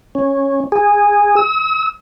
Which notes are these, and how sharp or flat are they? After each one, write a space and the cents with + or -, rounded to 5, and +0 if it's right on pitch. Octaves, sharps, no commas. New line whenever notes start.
C#4 -10
G#4 -15
E6 -45